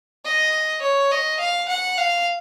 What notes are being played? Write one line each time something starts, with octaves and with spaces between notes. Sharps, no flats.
D#5
C#5
D#5
F5
F#5
F5